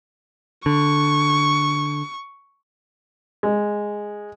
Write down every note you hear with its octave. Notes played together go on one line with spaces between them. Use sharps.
D3 C#6
G#3